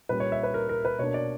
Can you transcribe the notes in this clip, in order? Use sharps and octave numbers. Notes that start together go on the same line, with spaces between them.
A#2 G3 C#4 B4
C#5
E5
B4
A#4
A#4
B4
B2 A#3 D4 C#5
D5